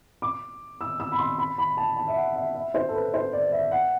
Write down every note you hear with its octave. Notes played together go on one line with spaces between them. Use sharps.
D6
E6
E6
B5
C6
B5
B5
A5
A5
E5
F#5
E5
E5
C5
A4
B4
C5
D5
E5
F#5